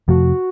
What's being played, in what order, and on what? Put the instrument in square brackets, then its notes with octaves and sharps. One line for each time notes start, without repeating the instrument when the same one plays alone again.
[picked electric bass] F2 C3 F3 A3 [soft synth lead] F#4